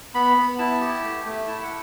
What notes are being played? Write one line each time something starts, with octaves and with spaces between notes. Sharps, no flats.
B3 B5
B3
E4 A5
G4
A3
A3
E4 A5
F#5